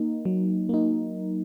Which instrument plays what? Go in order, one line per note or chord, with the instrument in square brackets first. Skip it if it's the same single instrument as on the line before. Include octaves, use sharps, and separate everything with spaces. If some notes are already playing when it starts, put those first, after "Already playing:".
Already playing: [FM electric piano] A#3 D#4
F#3
A#3 D#4